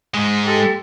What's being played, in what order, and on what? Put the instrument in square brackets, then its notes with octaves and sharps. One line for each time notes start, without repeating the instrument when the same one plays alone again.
[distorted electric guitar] G#2 G#3
[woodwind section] G4 A4